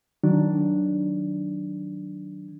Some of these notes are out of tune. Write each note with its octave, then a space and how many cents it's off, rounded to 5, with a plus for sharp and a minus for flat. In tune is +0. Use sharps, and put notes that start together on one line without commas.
D#3 +0 F#3 +10 D4 +0